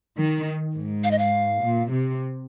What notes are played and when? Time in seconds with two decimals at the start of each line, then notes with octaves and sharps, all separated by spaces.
0.18 D#3
0.75 G#2
1.04 F5
1.11 D#5
1.18 F5
1.62 A#2
1.90 C3